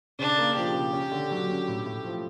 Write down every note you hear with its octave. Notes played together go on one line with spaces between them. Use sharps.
C#3 D4
A#3
F3 G4
C#3
C#4
D3
F#3
C#4
A2
A2
F3